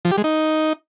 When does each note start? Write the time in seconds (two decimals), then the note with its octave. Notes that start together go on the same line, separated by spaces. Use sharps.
0.05 F3
0.11 G4
0.18 G#3
0.24 D#4